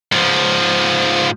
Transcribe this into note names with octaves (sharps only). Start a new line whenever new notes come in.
G#2 F3